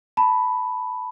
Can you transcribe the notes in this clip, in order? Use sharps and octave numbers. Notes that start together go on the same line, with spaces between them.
A5 B5